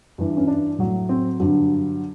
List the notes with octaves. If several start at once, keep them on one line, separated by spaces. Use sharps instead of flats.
G2 E3
C#4
D4
A2 F#3
C4
G2 D3 F#3